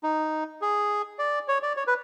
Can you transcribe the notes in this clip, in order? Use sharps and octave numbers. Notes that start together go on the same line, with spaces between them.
D#4
G#4
D5
C#5
D5
C#5
B4